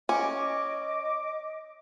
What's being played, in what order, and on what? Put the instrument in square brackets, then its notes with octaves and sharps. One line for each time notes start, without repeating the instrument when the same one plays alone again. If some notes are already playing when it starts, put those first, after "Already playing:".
[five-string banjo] C#4 [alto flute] D#5 [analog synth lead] D6